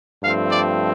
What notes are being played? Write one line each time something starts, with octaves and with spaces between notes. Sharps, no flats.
G2 F3 A3 C4 F5
D5